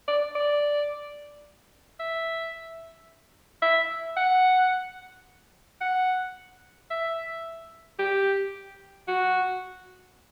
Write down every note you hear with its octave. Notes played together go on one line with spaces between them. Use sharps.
D5
D5
E5
E5
F#5
F#5
E5
G4
F#4